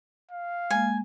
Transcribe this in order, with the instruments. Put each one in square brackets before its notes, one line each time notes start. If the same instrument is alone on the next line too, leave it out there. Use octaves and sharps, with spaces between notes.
[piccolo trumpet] F5
[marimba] G#3 A#3 [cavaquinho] G#5